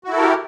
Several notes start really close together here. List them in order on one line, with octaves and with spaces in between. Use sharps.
F#4 E4 A4 A#4 G4